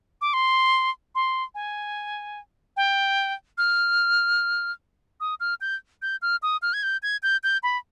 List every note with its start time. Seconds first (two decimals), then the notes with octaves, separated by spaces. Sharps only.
0.21 D6
0.33 C6
1.15 C6
1.55 G#5
2.77 G5
3.58 F6
5.20 D#6
5.40 F6
5.61 G6
6.02 G6
6.22 F6
6.43 D#6
6.62 F6
6.73 G#6
6.83 G6
7.03 G#6
7.23 G6
7.44 G6
7.63 B5